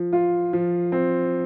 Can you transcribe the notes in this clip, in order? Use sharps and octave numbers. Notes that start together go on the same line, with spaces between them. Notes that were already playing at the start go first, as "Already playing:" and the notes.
Already playing: F3
F4
F3
C4